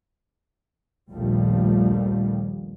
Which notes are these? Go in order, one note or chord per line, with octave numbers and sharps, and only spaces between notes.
A#1 D#2 A#2 F3 G3 A3